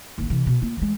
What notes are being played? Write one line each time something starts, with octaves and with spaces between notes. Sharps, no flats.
A1 D#2
C3 E3
B2
A#3 F4
E3 G#3